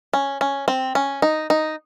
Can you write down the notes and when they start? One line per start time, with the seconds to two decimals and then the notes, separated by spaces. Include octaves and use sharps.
0.13 C#4
0.41 C#4
0.68 C4
0.95 C#4
1.22 D#4
1.50 D#4